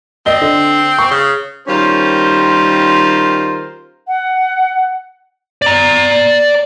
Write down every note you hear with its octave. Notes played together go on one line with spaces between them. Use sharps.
C4 D5 D#5 G7
D3
C#6
C#3
D#3 G3 C#4 F4 A#4 C5
F#5
D5 A#5